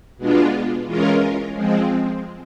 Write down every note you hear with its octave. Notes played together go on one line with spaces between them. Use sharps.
B2 G#3 B3 D4 F4
E3 G#3 C#4 F4 A#4
F3 G#3 C4